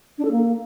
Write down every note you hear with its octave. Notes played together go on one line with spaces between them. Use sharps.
D4
A4
A#3